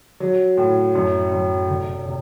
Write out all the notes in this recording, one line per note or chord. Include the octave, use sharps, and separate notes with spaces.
F#3
A2
F#2
F#2
F1
C3